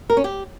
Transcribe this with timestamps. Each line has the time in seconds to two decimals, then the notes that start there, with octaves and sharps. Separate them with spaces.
0.10 A#4
0.17 C#4
0.24 G4